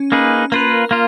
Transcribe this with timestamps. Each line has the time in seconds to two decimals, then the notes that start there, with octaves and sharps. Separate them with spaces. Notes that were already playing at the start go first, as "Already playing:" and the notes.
Already playing: C#4
0.12 A#3 D#4 G#4 B4
0.52 A#3 F4 A#4 B4
0.91 A#3 F4